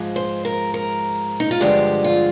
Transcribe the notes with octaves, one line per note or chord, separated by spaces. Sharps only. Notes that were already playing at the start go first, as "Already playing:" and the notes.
Already playing: G#2 F3 G#3
C5
A#4
A#4
D#4
F4
G2 D3 F3 G#3 G4
F4